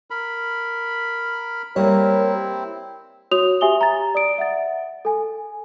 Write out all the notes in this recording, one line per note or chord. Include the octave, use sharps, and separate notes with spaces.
A#4 B5
G3 A#3 C4 E4 A#4 C#5
F#4 C#5 D#6 F7
G4 E5 G#5 D#6 G7
A#5 A6
D5 D#6 D7
E5 F#5 A6
A4 G#5